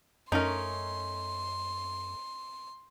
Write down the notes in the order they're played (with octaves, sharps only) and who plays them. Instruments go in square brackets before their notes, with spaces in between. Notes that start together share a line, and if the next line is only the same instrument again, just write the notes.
[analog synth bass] F#2 [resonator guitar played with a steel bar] A3 C#4 [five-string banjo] D#4 A#4 [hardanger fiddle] C6